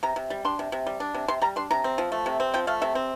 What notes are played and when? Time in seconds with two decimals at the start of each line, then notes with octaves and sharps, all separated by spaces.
0.03 C3 A#5
0.16 C3
0.30 G3
0.45 D4 C6
0.59 C3
0.72 C3
0.87 G3
1.00 D4
1.14 C3
1.28 C3 C6
1.42 G3 A#5
1.56 D4 C6
1.71 C3 A#5
1.84 C4
1.98 F3
2.12 A3
2.26 C3
2.40 C4
2.54 F3 G5
2.67 A3 F5
2.82 C3 E5
2.95 C4